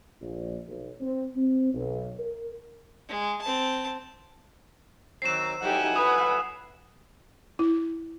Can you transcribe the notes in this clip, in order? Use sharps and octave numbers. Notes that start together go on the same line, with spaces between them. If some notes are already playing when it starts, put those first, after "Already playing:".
A#1
B1
C4
C4
B1
A#4
G#3
C4 A5
D#3 F#3 C4 C7 E7
F#3 A3 D#4 E4 G4 F#5 G#5
B4 D#6
E4